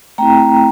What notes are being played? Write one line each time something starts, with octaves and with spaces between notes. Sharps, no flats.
A3 C4 E4 G5 A#5